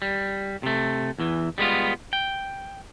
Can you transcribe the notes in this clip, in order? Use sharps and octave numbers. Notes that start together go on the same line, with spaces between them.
G3
C3 A3
E2 E3
G3 G#3 B3 F4
G5